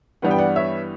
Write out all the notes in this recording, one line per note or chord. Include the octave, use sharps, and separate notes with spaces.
G2 E3 G3 B3 F#5
G5
D5 F#5
C#5 E5